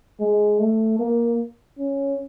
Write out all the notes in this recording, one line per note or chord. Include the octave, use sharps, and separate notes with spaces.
G#3
A3
A#3
C#4